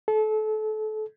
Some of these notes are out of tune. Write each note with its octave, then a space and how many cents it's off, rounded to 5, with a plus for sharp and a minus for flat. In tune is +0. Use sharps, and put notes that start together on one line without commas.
A4 -30